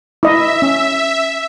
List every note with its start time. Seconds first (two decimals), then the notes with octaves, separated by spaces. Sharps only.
0.23 E4 D#5 E5
0.62 C#4